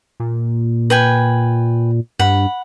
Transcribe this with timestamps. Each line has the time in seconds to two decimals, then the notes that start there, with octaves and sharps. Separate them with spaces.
0.20 A#2
0.90 B4 G5 G#5
2.19 G2 F#5 B5